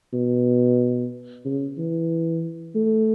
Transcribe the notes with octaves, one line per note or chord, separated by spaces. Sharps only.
B2
C#3
E3
A3